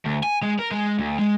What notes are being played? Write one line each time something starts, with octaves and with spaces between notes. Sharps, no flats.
D2
G#5
G#3
A#4
G#3
D2
G#3